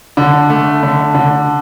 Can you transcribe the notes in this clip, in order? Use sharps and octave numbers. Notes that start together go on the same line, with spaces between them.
D3
A3
D3
D3